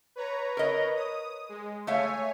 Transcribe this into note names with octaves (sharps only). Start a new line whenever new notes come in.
B4 C#5 A#5
A#4 D#5
D#6
G#3
A3 C#5 E5 F5 G#5